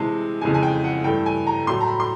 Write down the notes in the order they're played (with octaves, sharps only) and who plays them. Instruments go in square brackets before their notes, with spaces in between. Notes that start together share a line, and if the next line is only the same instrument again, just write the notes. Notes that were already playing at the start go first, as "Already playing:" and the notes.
Already playing: [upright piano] C3 E3 G#3 A5
F2 C#3 E3 G#3 G#5
G#5
G5
F#5
G2 E3 A3 G5
G#5
A#5
A2 F#3 A3 C6
A#5
B5
C6